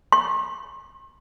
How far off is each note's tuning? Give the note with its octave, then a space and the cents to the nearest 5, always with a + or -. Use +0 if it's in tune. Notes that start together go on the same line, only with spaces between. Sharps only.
C6 +45